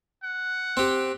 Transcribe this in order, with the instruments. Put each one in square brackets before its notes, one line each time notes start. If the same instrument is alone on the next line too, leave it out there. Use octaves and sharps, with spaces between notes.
[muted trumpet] F#5
[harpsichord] C4 G4